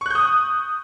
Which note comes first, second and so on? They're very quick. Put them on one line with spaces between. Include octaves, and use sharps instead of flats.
C#6 F#6 G6 D#6